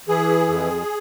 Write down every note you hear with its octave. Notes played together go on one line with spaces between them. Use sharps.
E3 G#4
F2